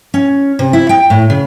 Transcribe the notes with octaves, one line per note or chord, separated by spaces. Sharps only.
C#4
C3
E4
G5
A2
C#3